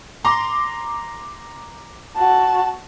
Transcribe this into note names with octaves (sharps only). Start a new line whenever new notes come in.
A#5 C6 D6
F#4 A5